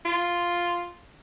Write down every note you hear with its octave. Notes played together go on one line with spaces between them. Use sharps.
F4